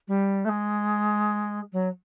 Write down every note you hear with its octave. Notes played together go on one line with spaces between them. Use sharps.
G3
A3
G#3
F#3